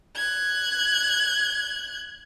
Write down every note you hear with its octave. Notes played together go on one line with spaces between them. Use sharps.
F#6 G#6